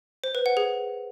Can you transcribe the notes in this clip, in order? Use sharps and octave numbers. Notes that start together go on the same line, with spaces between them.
C5
B4
F#5
G#4